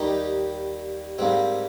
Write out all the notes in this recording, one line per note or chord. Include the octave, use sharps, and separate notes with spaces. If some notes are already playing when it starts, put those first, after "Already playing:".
Already playing: D#2 D#3 G3 D#4 G4
G#2 G3 A#3 C4